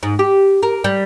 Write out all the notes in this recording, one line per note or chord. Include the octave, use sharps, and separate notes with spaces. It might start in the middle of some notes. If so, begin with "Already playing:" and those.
G#2
G4
A#4
G3